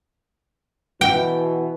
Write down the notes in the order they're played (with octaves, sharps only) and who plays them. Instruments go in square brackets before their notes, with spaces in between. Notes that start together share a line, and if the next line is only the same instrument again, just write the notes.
[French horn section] B2 E3 [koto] G5